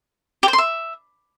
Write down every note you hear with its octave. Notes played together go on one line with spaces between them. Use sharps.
G4
C5
C6
E5